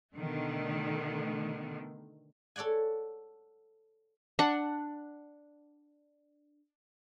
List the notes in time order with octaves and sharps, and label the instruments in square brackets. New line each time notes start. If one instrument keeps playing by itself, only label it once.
[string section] B2 D3 D#3 A3
[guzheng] A4 C#5 D5 F#5 G#5
[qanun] D4 F#5